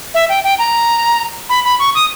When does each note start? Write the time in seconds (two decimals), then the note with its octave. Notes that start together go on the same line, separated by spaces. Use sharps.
0.14 E5
0.29 G5
0.44 G5
0.59 A#5
1.49 B5
1.65 B5
1.79 C#6
1.95 D#6